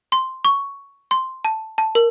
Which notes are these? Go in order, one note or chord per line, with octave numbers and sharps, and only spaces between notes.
C6
C#6
C6
A5
A5
A#4